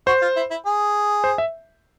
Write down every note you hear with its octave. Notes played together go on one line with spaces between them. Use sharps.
F#4 C5
F4
E4
E4
G#4
C5
E5